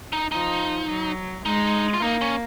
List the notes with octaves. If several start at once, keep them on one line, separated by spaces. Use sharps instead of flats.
D#4
F3 D#4
F#3
G#3 D#4
F4
A#3 D#4
C#4